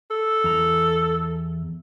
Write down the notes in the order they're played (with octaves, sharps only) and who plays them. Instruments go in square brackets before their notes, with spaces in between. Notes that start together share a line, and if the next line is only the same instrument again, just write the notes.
[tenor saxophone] A4
[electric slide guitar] E2 A#5